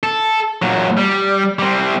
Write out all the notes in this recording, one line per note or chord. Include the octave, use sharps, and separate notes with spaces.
A4
A#2 F#3
G3
G3 C4